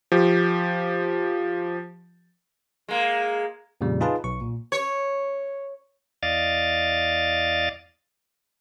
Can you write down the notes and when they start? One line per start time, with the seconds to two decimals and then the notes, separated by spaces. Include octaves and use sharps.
0.12 F3 G4
2.88 G#3 A#3
3.81 F2 A#2 C#3 G3
4.01 D#4 F4 G#4 B4 A5
4.24 B1 C#6
4.41 A#2
4.72 C#5
6.23 E2 D5 D#5 F5 A6